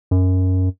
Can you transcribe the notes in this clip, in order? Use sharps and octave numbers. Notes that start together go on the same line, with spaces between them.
F#2